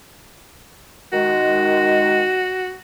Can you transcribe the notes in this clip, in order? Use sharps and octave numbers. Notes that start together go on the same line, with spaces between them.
D#3 G#3 F#4